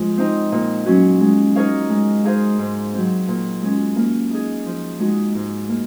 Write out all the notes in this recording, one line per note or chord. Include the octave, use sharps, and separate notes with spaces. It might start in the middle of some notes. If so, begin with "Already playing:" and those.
Already playing: F3 G#3 F4
C4 D#4
A#2
F#3 C#4 F#4
G#3
D#4 A#4 C#5 F5
G#3
D#4 G#4 C5 F5
G#2
F#3 C4
A#2
G#3 C#4
A#3
D#4 G#4
F3
G#3 D#4 F#4
G#2
A#3